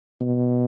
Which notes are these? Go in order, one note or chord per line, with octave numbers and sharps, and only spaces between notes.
B2